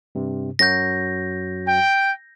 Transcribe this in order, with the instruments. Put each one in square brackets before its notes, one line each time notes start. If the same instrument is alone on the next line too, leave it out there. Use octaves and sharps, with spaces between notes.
[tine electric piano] G2 C3
[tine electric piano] F#2 F#3 F#4 [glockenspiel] G6 A#6
[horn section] G5